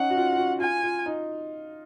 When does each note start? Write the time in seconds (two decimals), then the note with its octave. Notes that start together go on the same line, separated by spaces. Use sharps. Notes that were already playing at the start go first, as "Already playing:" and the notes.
Already playing: C#4 D#4 F#5
0.10 F#4
0.16 F4
0.33 F4
0.38 F#4
0.60 F4 G#5
0.83 F4
1.06 D#4